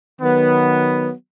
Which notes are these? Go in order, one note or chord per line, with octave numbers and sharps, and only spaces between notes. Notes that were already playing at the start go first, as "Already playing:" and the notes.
D#3 F#3 B3